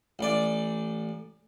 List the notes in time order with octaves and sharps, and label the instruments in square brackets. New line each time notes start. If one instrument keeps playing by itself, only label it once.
[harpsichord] A1 D5